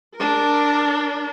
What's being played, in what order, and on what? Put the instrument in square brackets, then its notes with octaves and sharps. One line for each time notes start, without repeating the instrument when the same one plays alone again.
[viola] D4 A#4